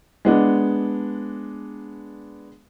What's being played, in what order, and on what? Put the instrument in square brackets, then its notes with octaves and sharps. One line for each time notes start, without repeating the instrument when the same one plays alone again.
[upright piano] G#3 B3 D4